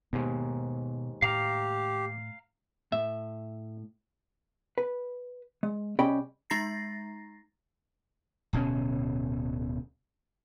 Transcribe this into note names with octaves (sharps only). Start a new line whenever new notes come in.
D#2 G#2 B2 B3
A2 G4 F5 A#5 F6
A2 E5
B4
G#3
C2 C#4 G4 D#5 G5 B5
G#3 D#4 A#5 A6 A#6 C7
D1 B2 B3 C#4